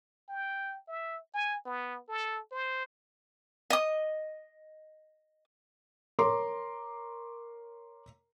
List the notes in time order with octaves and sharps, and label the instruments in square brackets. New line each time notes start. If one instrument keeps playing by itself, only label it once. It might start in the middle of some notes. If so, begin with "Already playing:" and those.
[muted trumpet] G5
E5
G#5
B3
A4
C5
[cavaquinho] D#5 D#6
[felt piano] A#4 C#5 A#5 C6 D6